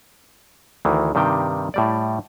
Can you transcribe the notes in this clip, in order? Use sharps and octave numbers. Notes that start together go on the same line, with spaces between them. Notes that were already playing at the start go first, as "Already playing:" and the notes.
D2 D#3 E3
G2 C3 D#3 G3 G5
A2 G3 D5